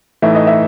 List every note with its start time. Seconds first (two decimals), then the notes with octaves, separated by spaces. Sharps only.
0.22 A2 E3 A3 D#4 E5
0.35 D#5
0.47 E5